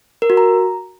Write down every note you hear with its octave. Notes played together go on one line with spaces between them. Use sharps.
A#4
F#4
A#5